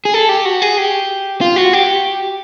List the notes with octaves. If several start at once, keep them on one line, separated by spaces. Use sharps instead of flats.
G#4
A4
G4
F#4
G#4
G4
F4
F#4
G4